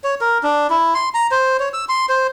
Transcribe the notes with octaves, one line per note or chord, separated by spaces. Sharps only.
C#5
A#4
D4
E4
C6
A#5
C5
C#5
E6
C6
C5